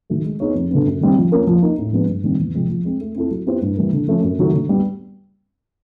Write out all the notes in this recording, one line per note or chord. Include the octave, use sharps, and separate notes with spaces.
D#3 F#3 A3
G#3
B3 D#4 G#4 C#5
F2
D3 F#3 B3
F#2
D#3 G3 C4
F3
A#3 C#4 F4 A#4
F3
A#3 D#4
A2
F3 G#3 B3 D4
G2
D#3 G3 C4
E2
C3 F3 G#3 C4
F3
G#3 C4
A3
C4 E4 A4
F#3
B3 E4 G4 C5
G2
E3 G3 A#3
D3
F3 A3 C#4
F#2
D#3 F#3 A3
D3
G3 B3